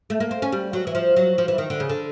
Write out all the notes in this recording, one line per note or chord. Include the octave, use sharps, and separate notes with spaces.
A3
A#3
C4
C#4
G3
F#3
E3
F3
F#3
F3
E3
D#3
D3
C#3
D3